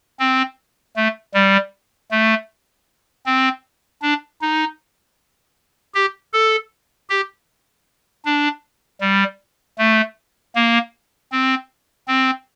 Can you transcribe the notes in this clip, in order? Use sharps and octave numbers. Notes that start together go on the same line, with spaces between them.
C4
A3
G3
A3
C4
D4
D#4
G4
A4
G4
D4
G3
A3
A#3
C4
C4